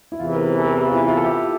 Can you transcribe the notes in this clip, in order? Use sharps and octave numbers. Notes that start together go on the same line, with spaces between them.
E4
E2 C3 E3 F4
A#4
C5
A4
A#4
G4
F4
E4
F4
A4
G4